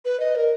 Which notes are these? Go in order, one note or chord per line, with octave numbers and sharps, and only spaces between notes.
B4
D#5
A#4